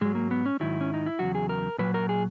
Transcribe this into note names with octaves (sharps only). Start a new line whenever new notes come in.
G#2 F#3 G#3
A#3
B3
C#4
G#2 D#3 F#3 E4
C#4
D#4
E4
E2 C#3 F#3 F#4
G#4
A#4
A#2 F#3 B4
A#4
G#4